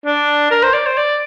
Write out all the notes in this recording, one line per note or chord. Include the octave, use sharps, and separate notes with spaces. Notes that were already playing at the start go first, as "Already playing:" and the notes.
D4
A#4
C5
D5
C5
D5